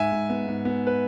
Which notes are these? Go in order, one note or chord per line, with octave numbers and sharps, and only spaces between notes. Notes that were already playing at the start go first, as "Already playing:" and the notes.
Already playing: G#2 E5 G#5
G#2
B3
G#2
B3
B4